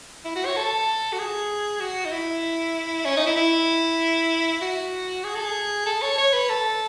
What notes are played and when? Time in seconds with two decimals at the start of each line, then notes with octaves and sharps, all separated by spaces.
0.25 E4
0.35 F#4
0.46 C#5
0.57 A4
1.12 F#4
1.19 G#4
1.80 F#4
2.05 D#4
2.12 E4
3.05 C#4
3.17 D#4
3.26 E4
3.37 E4
4.61 F#4
5.24 G#4
5.35 A4
5.46 G#4
5.86 A4
6.02 C#5
6.18 C#5
6.33 B4
6.50 A4